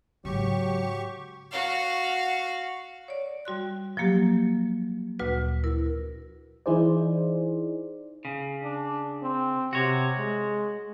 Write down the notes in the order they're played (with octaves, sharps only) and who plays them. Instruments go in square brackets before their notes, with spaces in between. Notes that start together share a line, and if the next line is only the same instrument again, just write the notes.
[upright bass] G#2 C#3 [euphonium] F#3 [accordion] G4 C#6
[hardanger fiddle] F#4 F5
[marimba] C#5 D5
G3 F#4 C6 F#6
F3 F#3 A#3 G4
D2 A#2 F#4 B4
E4 A#4
[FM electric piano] E3 D#4 E4 G#4 C5 D5
[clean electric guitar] C#3
[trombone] D4
C4
[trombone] C3 [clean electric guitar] F#4 C#5
[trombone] G#3